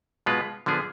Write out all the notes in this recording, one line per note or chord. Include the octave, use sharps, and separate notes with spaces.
B2 G#3 B3 F4 B4
D3 F3 B3 D4 G#4